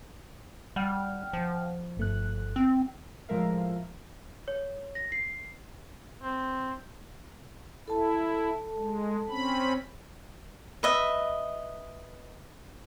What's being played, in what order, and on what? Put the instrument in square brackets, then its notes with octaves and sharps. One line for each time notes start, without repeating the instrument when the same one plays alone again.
[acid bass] G3 [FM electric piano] F#5 G5 F6
[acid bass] F3
[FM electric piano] G1 A3 F#6
[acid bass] C4
[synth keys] A2 F3 G#3 A#4 E5 F5
[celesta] C#5
A#6
C7
[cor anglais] C4
[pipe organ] E4 [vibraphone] A4 A5
[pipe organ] G#3
C4 C#4 B5
[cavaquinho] B4 D#5 E5